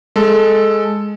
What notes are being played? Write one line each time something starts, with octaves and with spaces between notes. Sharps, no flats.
G#3 A4